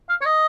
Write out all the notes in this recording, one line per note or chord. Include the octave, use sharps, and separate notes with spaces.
F5
C#5
D#5